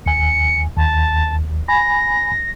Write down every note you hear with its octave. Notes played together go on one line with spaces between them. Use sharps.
D#2 G#5 C#7
D#2 A5
G#5 B5 A#6